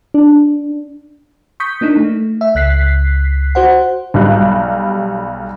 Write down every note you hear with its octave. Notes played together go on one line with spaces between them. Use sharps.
D4
C#6 D#6 G6 B6
A#3 D4 D#4
A3
E5
C#2 F#6 B6 C7
F#4 C5 F#5
B1 G3 F#6